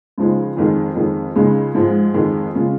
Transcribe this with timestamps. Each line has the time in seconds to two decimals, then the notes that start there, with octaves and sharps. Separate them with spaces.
0.18 C#2 C#3 F3 G#3 D#4
0.57 F2 D#3 G#3
0.96 F2 D#3 G#3
1.35 C#2 C#3 G#3 D#4
1.75 G#2 F3 G#3
2.14 F2 D#3 G#3
2.55 C#3 G#3 F4